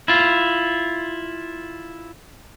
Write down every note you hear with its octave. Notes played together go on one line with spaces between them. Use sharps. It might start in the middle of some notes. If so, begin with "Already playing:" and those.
E4 F4